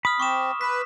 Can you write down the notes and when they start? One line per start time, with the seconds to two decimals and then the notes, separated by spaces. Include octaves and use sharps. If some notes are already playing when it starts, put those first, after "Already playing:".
0.05 B5 D#6 F6
0.20 C4 C#6 D6 E7
0.61 B4 B6